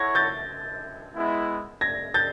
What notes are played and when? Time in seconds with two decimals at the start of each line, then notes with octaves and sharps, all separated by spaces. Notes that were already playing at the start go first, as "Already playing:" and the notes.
Already playing: E4 A4 C#5 F#5 G#6 A#6
0.15 G6 A6
1.15 G#3 B3 E4
1.81 G#6 A#6
2.14 G6 A6